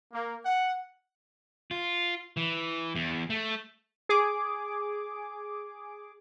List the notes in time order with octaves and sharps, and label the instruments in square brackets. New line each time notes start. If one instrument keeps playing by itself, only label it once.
[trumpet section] A#3
F#5
[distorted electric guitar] F4
E3
E2
A3
[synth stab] G#4 D6